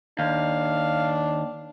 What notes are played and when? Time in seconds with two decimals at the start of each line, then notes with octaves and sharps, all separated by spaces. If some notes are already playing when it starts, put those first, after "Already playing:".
0.19 D#2 D4 F5